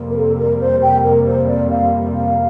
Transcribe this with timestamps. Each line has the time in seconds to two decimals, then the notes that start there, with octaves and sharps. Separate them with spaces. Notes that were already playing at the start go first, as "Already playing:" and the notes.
Already playing: F2 C3 G3 A#3
0.10 A#4
0.17 A4
0.38 A#4
0.60 C5
0.82 G5
1.04 A#4
1.26 C5
1.48 D5
1.70 F5
2.14 F5